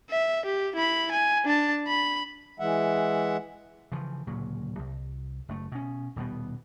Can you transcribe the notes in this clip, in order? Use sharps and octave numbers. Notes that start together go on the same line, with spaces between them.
E5
G4
E4 B5
G#5
D4 A5
B5
E3 G#3 E5 F#5
C#3 E3 F3
D1 A#2 C#3 F#3
C2
F#1 A3
B2 C#4
D#1 B2 G3 B3